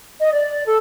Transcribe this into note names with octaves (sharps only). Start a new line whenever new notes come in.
D#5
D5
A4